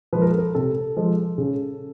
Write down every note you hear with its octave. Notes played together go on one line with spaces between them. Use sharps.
F3 G#3 B4
A#4
A4
A#4
C3 A4
F3 G#3
C#3